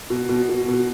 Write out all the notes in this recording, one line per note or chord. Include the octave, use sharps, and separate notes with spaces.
B2
B2
B2
B2